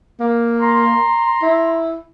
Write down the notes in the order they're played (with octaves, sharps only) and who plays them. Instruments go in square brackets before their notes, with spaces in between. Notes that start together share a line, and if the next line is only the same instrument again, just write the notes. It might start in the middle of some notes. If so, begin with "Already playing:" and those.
[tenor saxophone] A#3
[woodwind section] A#5 C6
[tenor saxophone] E4